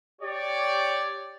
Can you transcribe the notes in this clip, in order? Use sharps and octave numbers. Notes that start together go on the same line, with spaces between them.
G4 C#5 D5